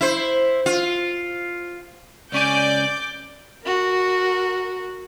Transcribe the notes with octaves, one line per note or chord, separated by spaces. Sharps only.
E4 C5
F4
C#2 C#4 D5 G#5 D6 G6
F#4 A#4